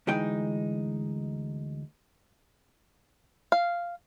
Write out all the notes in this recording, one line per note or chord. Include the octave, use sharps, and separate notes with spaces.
D2 E3 G#3 D#4 G5
F5